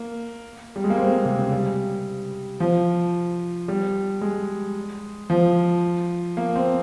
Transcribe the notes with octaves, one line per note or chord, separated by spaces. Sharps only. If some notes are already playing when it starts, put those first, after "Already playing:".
Already playing: A#3
G3
G#3
A#3
C4
G#3
A#3
C3
C#3
G3
F3
G3
G#3
F3
A#3
C4